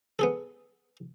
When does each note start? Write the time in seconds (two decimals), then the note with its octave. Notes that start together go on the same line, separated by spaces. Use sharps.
0.19 B3 G#4 A4